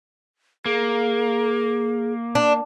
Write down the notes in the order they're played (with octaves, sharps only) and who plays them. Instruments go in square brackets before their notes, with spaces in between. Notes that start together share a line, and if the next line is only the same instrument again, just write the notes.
[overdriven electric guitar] A#3 [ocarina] G#4
[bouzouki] D4